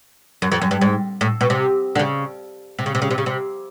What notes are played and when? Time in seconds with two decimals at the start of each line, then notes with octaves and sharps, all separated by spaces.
0.42 F#2
0.52 F2
0.62 F#2
0.71 G2
0.81 G#2
1.21 A2
1.41 B2
1.50 C3
1.95 D3
1.99 C#3
2.79 C3
2.86 C#3
2.95 C3
3.02 C#3
3.11 C3
3.18 C#3
3.26 C3